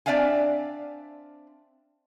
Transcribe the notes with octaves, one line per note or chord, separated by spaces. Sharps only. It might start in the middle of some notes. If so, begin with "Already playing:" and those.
C4 D4 D5 E5 F5 G#5